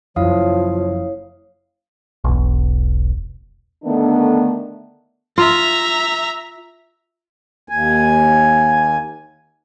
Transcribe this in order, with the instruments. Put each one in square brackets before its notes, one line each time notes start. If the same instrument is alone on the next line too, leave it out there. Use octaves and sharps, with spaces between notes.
[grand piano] F#1 [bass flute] F3 [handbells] E4 F5 D#6 [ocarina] C#5
[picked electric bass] E1 B1
[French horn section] D3 D#3 A3 B3 D4
[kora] F4 [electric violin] E5 A#5
[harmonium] D#2 G#5